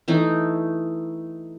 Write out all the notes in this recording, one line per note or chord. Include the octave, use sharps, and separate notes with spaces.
E3 A3 D#4